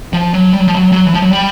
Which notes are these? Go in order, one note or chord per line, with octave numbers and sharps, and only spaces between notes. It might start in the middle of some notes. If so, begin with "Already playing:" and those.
F3
F#3
G3
F#3
F3
F#3
F#3
E3
F3
F#3
G3